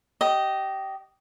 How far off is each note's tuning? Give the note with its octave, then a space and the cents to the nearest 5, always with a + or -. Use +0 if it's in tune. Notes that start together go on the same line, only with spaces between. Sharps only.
G4 -20 D#5 +0